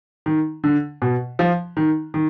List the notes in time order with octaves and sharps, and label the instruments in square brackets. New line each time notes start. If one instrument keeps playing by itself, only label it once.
[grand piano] D#3
D3
B2
F3
D#3
D#3